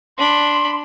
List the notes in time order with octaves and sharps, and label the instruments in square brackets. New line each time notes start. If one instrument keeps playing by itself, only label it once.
[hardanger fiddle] D4 B5 [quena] C6